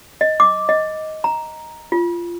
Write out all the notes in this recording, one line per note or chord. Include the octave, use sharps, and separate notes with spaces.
D#5
D6
D#5
A#5
F4